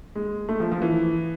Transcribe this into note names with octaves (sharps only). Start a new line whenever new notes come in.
G#3
A3
F3
F3
E3